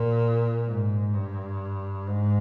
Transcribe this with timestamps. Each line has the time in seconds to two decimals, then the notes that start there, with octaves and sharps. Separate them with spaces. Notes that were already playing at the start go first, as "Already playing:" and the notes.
Already playing: A#2
0.66 G#2
1.14 G2
2.07 G#2